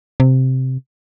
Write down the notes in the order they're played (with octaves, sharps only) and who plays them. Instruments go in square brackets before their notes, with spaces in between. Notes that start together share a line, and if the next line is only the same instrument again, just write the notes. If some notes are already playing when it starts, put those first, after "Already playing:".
[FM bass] C3